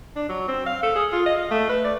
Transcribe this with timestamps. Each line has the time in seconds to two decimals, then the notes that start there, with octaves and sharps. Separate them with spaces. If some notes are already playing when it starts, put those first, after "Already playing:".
0.16 D4
0.29 F#3
0.48 C4
0.66 F5
0.83 A4
0.96 G#4
1.12 F4
1.26 D#5
1.37 F5
1.51 A3
1.69 B4
1.84 D5